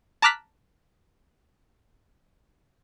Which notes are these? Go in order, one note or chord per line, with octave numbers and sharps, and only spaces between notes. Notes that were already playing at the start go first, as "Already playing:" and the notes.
A5 A#5 D6 F6 F#6 B6